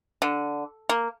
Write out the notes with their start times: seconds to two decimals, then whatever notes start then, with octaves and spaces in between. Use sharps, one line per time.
0.22 D3
0.89 A#3